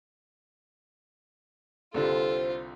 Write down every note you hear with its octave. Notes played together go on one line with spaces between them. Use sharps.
C2 D3 G3 F4 A4 C5